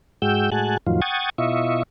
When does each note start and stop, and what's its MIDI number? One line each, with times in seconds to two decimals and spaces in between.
0.22 0.50 44
0.22 0.50 56
0.22 0.50 66
0.22 0.50 79
0.22 0.50 88
0.22 0.50 91
0.52 0.77 45
0.52 0.77 56
0.52 0.77 66
0.52 0.77 80
0.52 0.77 81
0.52 0.77 90
0.87 1.01 41
0.87 1.01 45
0.87 1.01 51
0.87 1.01 53
0.87 1.01 54
0.87 1.01 65
1.02 1.30 78
1.02 1.30 79
1.02 1.30 85
1.02 1.30 87
1.02 1.30 92
1.02 1.30 93
1.38 1.83 47
1.38 1.83 64
1.38 1.83 65
1.38 1.83 75
1.38 1.83 76
1.38 1.83 85